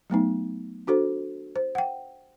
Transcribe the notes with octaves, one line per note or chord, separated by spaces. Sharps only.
F#3 A3 B3 D#4
D4 F#4 A4 C5
C5
F#5 G5